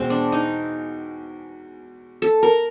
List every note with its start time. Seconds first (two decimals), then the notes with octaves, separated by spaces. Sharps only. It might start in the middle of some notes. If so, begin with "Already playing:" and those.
Already playing: E2 B2 G#3 C4
0.10 D4
0.32 D#4
2.22 A4
2.43 A#4